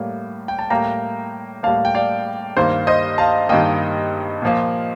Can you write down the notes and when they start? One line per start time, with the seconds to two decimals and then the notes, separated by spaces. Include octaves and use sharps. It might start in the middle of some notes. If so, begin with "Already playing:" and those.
Already playing: A2 G3 A#3
0.48 G5
0.59 A5
0.70 A2 G3 A#3 G5 A#5
1.63 A2 G3 A#3 F5 A5
1.85 G5
1.95 D5 F5
2.57 G2 D#3 A#3 C5
2.87 C5 D#5
3.18 F5 A5
3.49 G2 D#3 A#3 D#5 G5
4.42 A#2 F3 A#3